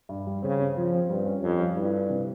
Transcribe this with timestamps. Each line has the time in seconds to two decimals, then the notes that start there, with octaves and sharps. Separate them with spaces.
0.09 G2
0.27 G3
0.42 C#3 C4
0.60 C4
0.77 F3 F4
0.93 C4
1.10 G2 G3
1.26 C#4
1.43 F2 C#4
1.60 G3
1.76 G2 E4
1.93 E4
2.10 C3